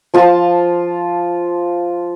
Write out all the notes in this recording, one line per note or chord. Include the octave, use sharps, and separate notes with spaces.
F3 F4 A5